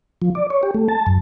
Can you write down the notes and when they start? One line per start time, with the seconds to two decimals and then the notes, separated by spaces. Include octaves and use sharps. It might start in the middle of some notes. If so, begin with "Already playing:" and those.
0.22 F3
0.35 D5
0.50 C#5
0.63 G4
0.74 A3
0.88 A5
1.07 F#2